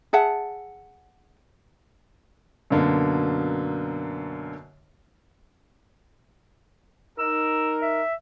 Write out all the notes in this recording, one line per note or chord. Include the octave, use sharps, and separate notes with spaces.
G#4 E5 F#5 A5
F#2 B2 D3 A#3
D#4 A#4 E6
E5